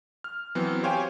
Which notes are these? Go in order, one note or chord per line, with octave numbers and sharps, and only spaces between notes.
F6
E3 F#3 B3 C4
G4 C5 C#5 F5 G5 G#5